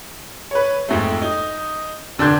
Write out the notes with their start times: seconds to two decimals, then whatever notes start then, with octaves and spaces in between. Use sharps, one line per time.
0.51 B4 C#5
0.89 F2 G#2 A3
1.22 D#4
2.18 F1 D3 D4 C6 G6 G#6